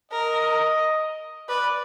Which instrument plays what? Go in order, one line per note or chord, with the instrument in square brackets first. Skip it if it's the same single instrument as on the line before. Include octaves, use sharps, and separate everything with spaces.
[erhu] A#4 [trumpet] D#5
[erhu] B4 [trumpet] D5